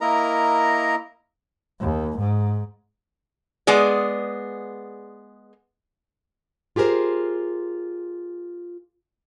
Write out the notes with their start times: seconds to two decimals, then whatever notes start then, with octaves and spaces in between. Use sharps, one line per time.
0.01 A#3 E4 A#4 D#5 A#5
1.81 D#2
2.19 G#2
3.67 G#3 B3 G#4 D5
6.76 F4 G4 G#4 A#4 C5